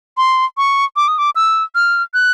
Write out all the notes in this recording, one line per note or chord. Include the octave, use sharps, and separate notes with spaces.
C6
C#6
D6
D#6
D6
E6
F6
F#6